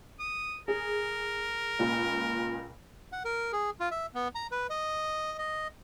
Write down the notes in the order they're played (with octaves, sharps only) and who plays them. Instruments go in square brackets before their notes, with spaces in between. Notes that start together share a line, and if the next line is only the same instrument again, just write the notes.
[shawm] D#6
[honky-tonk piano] G#4 [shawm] A#4
[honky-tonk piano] C#2 A#2
[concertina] F#5
A#4
G#4
F4
E5
B3
A#5
B4
D#5
D#5